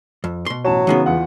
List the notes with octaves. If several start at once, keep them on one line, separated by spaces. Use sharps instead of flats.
F2
B2 C6
A1 F#3 A5 E7
C#3 E3 G#3 B3 D#4 F#4
E2 F4 F#5